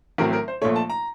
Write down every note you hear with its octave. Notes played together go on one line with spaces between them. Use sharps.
A1 A2 F#3 C4 A#4
A#4
C5
A#1 A#2 A3 C#5
A5
A#5